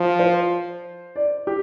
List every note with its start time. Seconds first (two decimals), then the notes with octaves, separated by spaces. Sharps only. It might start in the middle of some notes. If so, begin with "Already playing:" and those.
Already playing: F3
0.19 C5
1.16 D5
1.47 G4